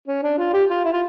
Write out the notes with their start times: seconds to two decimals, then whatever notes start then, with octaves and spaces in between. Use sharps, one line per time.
0.08 C#4
0.23 D4
0.38 F4
0.53 G4
0.70 F4
0.85 E4
0.93 F4